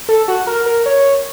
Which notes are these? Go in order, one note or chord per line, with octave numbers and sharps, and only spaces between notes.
A4
F#4
A#4
A#4
C#5